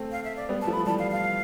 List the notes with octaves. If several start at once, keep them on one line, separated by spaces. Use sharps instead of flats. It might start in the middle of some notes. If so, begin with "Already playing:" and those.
Already playing: A3 C4
F5
E5
D5
G3 B3
A5
F3 A3
B5
E3 G3 A5
F5
F5